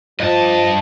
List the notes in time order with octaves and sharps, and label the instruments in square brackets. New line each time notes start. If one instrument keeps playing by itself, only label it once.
[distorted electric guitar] G2 A5 [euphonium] F3 [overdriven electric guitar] D#5